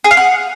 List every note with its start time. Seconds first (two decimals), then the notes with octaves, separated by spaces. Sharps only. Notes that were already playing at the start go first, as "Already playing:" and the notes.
0.04 G#4
0.11 F5
0.17 F#5